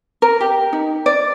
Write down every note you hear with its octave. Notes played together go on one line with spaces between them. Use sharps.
A#4
G4
D#4
D5